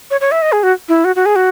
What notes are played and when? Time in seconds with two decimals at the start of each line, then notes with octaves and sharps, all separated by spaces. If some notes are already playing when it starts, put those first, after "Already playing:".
0.11 C#5
0.21 C#5
0.31 E5
0.42 D#5
0.52 G#4
0.63 F#4
0.88 E4
1.04 F#4
1.16 F#4
1.26 G#4
1.36 F#4